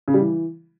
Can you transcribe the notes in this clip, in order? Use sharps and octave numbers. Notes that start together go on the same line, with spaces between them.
C#3
G3
E3